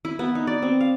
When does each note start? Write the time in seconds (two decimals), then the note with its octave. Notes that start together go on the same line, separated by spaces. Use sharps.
0.05 E4
0.19 B3
0.35 D#4
0.47 D5
0.62 C4
0.81 F5